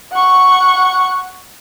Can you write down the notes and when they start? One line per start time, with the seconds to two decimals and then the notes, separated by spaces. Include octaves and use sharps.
0.12 F#5 C#6